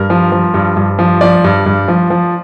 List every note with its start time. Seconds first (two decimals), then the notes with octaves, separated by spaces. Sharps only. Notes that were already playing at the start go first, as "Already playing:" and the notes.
Already playing: G2 A#4
0.10 F3
0.32 F3
0.54 G2
0.77 G2
0.99 F3
1.21 F3 D5
1.44 G2
1.66 G2
1.88 F3
2.10 F3